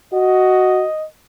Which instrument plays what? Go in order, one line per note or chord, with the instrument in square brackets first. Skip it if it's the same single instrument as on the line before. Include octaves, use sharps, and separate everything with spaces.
[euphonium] F#4 [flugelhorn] D#5